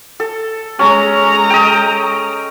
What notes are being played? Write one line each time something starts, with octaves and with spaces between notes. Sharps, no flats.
A4
G#3 C#4 A#5
D#5 G5